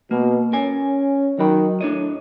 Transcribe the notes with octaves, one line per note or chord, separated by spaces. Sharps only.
B2 A#3
C#4 A#4 G#5
D#3 F#3 F#4 B5
A2 D4 C#5 D#5